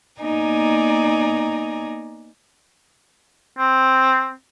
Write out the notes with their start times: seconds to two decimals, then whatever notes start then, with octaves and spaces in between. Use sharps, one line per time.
0.21 A#3 B3 D#4 D5 G#5 A#5
3.58 C4